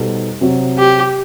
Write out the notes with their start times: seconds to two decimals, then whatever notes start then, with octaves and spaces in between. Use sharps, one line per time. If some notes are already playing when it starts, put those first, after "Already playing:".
Already playing: B2 G3 D#4 A4 C5
0.41 C3 F#3 C4
0.78 G4